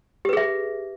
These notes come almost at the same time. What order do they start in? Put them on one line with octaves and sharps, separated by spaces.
G4 B4 G#4 E5